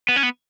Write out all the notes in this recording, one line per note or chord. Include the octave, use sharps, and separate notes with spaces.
B3
C#4
B3